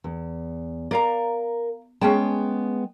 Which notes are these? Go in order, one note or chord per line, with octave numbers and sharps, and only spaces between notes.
E2
A#4 D5 F5 A#5
G#3 B3 C#4 G#4 G5 A5